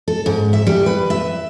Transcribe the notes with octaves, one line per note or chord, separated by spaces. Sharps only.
A4
G#2
E5
G3
B4
E5